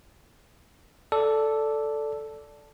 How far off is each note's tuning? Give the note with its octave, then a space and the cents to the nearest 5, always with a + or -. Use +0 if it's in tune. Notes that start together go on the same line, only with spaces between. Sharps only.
A4 +0 D5 -10